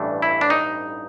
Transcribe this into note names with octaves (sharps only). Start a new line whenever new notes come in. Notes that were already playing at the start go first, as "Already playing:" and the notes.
Already playing: A1 G2 E3 A3 D4
E4
D4
D#4